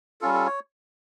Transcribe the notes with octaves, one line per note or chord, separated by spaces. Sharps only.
G3 C#4 F4 A4
A4
C#5